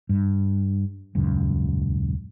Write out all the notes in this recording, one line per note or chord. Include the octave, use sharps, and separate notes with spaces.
G2
D#1 C#2 F#2